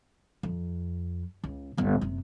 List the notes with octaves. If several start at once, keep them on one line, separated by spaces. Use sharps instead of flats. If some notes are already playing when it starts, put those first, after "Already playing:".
F2
C#2
G1 C#2
F#1 C3